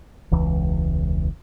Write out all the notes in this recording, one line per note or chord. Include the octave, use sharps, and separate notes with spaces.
E1 C#2 E3